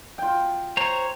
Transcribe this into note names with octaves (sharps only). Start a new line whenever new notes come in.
F4 G5
C5 C#5 A#5